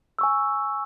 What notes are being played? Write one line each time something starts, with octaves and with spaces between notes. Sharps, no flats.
G#5 C#6 E6